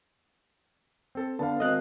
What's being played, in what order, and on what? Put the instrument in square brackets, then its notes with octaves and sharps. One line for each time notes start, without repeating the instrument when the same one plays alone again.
[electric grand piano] C4 A4
[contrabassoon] D3 [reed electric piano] B3 [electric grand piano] F5 A5
[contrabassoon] G#1 [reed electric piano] D#5 F#6